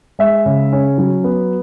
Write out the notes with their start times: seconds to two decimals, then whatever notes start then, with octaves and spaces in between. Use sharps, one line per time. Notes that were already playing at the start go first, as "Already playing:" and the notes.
0.19 G#3 E5
0.46 C#3
0.73 C#4
0.98 F#3
1.24 B3